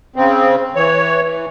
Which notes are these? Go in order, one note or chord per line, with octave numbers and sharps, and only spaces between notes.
C#3 C4
E3 C#5
E3